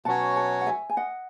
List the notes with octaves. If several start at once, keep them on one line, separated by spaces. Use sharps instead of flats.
B2 F#3 C#4 F#4 C#5 F#5 A5
F#5 A5
F#5
E5 G#5
G#5
D#5 F#5